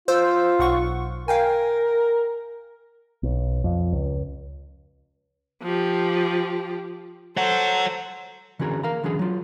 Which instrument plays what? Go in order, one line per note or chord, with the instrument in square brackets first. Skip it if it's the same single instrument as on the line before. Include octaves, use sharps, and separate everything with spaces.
[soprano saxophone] F4 [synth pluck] C5 E6
[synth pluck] B1 F#5 C#6
[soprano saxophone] A#4 [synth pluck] F5 G5 G#5
[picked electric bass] B1
F2
C#2
[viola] F3 G4
[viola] A4 C5 [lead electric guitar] C#5 F#5
[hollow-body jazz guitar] D3 E3 C#4 F#4 G#4 A#4
A#4 F5 A#5
D3 E3 F#3 C#4 G#4
F#3 F4